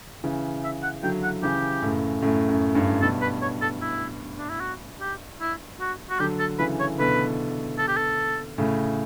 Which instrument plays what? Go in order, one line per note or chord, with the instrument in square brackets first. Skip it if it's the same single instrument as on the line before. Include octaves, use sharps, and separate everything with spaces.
[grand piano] C#3 E3
[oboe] E5
F#5
[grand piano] D3 F#3 [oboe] G5
[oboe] F#5
[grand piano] C#3 E3 [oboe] G4
[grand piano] F#2 A2
F#2 A2
F#2
G2
[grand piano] G2 B2 [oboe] A4
[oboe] B4
C#5
A4
E4
D4
E4
F#4
G4
E4
F#4
F#4
[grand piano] D3 F#3 [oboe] G4
[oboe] A4
[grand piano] C#3 E3 [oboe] B4
[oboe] C#5
[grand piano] B2 D3 [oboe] B4
[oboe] A4
G4
A4
[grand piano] A2 C#3